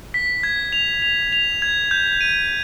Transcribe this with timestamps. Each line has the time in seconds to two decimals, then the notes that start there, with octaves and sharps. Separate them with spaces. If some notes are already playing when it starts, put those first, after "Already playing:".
0.14 B6
0.43 G#6
0.73 F7
1.02 F7
1.33 F7
1.62 G#6
1.91 G6
2.21 D#7